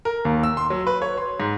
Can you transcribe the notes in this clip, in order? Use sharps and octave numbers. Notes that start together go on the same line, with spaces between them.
A#4
D#2
E6
C6
F#3
B4
C#5
C6
G#2